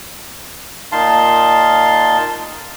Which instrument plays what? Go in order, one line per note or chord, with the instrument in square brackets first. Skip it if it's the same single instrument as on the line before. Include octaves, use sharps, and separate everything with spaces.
[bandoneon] A#2 D#4 F5 A5 C6